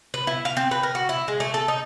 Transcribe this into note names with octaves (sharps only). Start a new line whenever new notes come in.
B4
E4
F5
C4
B4
A#4
F#4
E4
G#3
A3
A4
D#4